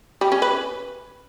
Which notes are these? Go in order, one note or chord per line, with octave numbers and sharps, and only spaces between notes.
G3
C#4
B4